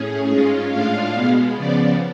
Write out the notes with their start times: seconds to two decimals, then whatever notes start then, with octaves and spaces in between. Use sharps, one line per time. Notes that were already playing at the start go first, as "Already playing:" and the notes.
Already playing: A2 C#4 G#4
0.29 G#2 G#3 C#4 F4
0.70 A2 G#3 D4 F4 F5
1.13 B2 G#3 B3
1.55 C#3 F3 B3 D5